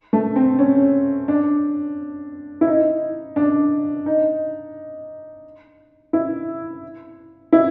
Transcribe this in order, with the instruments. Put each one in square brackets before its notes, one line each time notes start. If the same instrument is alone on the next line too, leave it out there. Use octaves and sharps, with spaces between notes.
[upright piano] A3
C4
C#4
D4
E4
D#4
D4
D#4
E4
E4